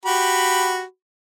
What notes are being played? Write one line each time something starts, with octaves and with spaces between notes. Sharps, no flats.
F#4 G4 B5